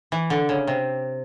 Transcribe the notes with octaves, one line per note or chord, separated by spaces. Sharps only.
E3
D3
C#3
C3